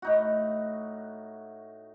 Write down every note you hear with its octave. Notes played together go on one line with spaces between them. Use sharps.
A2 D#4 F#4